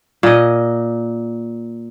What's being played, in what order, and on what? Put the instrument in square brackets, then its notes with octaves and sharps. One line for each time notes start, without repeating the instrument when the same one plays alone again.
[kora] A#2 D#5